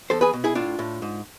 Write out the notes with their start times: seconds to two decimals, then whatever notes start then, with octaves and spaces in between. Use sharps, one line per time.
0.10 E2 A4 C5
0.21 G#4 B4
0.33 B2
0.44 E4 G#4
0.55 A2 D4 F4
0.79 A2
1.02 G#2